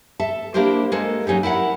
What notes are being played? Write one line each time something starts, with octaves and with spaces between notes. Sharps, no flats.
A4 E5 A5
A#3 D4 E4 G4 A#4 C5
G#3 A#3 A4
F#3 C#4 D#4 G4
E4 A#4 E5 F#5